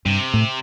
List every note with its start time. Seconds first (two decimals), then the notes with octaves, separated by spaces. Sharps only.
0.05 G2 C3
0.34 A2